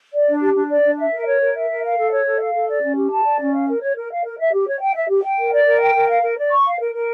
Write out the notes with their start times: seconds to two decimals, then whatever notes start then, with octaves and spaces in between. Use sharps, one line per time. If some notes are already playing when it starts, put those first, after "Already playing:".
0.13 D5
0.27 D4
0.41 G4
0.55 D4
0.69 D5
0.84 D4
0.98 E5
1.12 A#4
1.26 C#5
1.40 A#4
1.55 E5
1.69 A#4
1.83 F5
1.97 A4
2.11 C#5
2.25 A4
2.40 F5
2.54 A4
2.68 D5
2.82 C#4
2.96 G4
3.11 A5
3.24 D5
3.39 C#4
3.53 F5
3.68 A#4
3.81 C#5
3.95 A#4
4.10 F5
4.24 A#4
4.38 E5
4.52 G4
4.67 C#5
4.80 G5
4.95 E5
5.09 G4
5.23 G5
5.37 A#4
5.51 D5
5.65 A#4
5.80 G5
5.94 A#4
6.08 F5
6.23 A#4
6.37 D5
6.51 C#6
6.66 F5
6.79 A#4
6.93 A#4